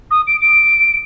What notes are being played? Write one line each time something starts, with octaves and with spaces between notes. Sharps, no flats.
D#6
D7
D7